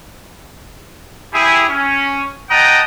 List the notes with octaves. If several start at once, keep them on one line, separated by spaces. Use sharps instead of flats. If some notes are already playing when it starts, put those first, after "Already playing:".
E4 G4 G#4
C#4
D#5 F#5 G5 A5 A#5 D#6